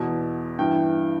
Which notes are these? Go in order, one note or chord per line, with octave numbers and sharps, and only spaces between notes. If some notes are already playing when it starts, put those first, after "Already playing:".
Already playing: E2 B2
G2 E3 G5